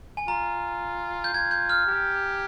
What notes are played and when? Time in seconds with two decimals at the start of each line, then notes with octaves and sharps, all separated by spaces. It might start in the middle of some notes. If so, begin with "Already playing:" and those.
0.17 G#5
0.28 F4 A#5
1.24 G6
1.34 F4 G#6
1.51 G6
1.69 F6
1.87 G4